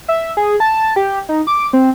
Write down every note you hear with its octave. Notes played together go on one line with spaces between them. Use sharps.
E5
G#4
A5
G4
D#4
D6
C4